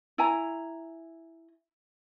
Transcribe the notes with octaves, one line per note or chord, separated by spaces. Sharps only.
E4 G#5 A#5